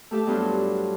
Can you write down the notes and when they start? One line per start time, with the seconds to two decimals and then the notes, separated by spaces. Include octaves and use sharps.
0.11 A3 G4 A4 E5
0.27 G2 F#3 B3 D4 F4 C6